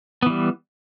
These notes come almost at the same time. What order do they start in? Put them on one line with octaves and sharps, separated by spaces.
B3 E3 G3